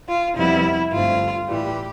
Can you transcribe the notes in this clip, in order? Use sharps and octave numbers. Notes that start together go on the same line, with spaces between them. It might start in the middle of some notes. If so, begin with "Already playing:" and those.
F4
F2 C3 G3 B3 E4
G2 D3 A3 C4 F4
A2 E3 G3 G4